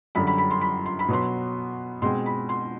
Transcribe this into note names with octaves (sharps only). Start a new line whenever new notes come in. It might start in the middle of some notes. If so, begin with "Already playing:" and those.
F#2 D3 G3 B5
B5
B5
C6
B5
C6
B5
B2 F#3 B3 C6
B2 G#3 C4 C6
B5
C6